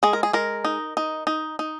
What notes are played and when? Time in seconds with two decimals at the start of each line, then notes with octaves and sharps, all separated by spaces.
0.03 G#3 G#4
0.13 A#4
0.23 G#4
0.33 G#3 A#4
0.65 D#4
0.97 D#4
1.27 D#4
1.59 D#4